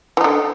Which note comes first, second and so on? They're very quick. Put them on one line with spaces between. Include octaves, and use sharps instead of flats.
E3 D#4 D3